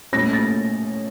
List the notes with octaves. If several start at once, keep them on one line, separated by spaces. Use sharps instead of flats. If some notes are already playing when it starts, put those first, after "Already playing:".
A#2 A3 C#4 A#6
A6